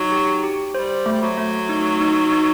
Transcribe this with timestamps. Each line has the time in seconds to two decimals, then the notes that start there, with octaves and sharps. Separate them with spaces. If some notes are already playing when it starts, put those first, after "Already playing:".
Already playing: F#3 D#4
0.12 G4
0.44 G4
0.74 G3 C5
1.06 A3
1.13 G3
1.22 F#3
1.38 A3
1.69 D#4
2.01 D#4
2.32 D#4